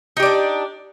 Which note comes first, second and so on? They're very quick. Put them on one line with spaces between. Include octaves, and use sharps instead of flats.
D#4 G4 D5 D4